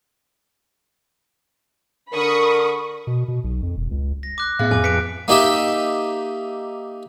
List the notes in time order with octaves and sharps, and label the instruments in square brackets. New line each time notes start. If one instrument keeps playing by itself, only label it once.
[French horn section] D3 D4 A#4 [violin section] B5 C#6 D#6
[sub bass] B2
B2
B1
F2
E1
C#2
[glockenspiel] A#6
D6 F#6
[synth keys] A2 B3 E5 [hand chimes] G#4 F5
[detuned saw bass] F2 [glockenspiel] G#5 D6
[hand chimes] B4 F#6 [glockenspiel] B6 D7 [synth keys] C#7
[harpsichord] A#3 D#4 G4 E5